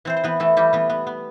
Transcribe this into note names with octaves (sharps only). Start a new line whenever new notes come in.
E3 C4 C5
C5
E3 B3 B4
E3 A3 A4
E3 G3 G4
E3 B3 B4
B3
B3